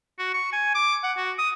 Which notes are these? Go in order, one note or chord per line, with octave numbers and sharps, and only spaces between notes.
F#4
C#6
G#5
D6
F#5
F#4
D#6